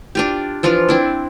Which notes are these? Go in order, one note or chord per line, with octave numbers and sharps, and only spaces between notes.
D4 F4 G4
E3 F3 D4 F4
C4 D4 E4